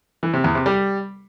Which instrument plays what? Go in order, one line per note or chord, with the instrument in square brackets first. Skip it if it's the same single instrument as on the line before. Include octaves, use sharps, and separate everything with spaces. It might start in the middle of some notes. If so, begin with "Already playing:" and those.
[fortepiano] E3
C3
E2
C3
G3